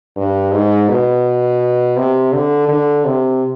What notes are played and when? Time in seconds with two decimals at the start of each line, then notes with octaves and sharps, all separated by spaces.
0.17 G2
0.52 G#2
0.89 B2
1.96 C3
2.33 D3
2.69 D3
3.05 C3